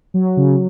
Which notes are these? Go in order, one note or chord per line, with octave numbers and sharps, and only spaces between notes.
F#3
C#3